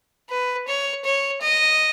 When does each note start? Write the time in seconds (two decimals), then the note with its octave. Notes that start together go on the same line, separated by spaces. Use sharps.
0.30 B4
0.68 C#5
1.05 C#5
1.41 D#5